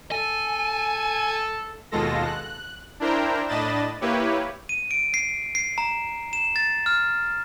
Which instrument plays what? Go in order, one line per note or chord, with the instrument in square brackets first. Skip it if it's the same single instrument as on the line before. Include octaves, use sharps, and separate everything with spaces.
[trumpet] A4 [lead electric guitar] G#5
[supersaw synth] D#2 B2 G#3 F4 A4 A#6
F#6
D4 E4 A#4 C5 G5 A#5
A2 D4 D#5 B5 A6 E7
A#3 E4 G4 B4 C#5
[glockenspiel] D#7
D7
C7
C7
A#5
E7
A6
F6